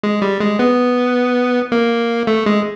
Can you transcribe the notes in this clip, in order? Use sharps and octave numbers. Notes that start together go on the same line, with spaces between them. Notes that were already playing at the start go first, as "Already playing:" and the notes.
G#3
G3
G#3
B3
A#3
A3
G#3